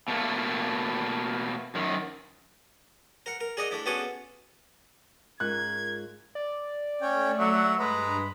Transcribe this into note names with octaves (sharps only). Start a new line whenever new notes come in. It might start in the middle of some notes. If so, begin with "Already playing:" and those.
B2 A3 A#3
F#2 D#3
A#4 F#5
A#4
G#4 D5 D#5 F#5 A#5
A3 D4 E4
B3 C#4 D4 F#4 G#4 A4
G#2 C#4 F4 A#4 F#6 G#6
D5
A3 C#4 C#5 G5
F#3 E5 F#5
G2 G#3 B4 A#5 B5